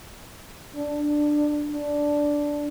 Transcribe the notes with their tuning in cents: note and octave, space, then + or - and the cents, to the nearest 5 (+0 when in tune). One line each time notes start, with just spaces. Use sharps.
D4 +10
D4 -5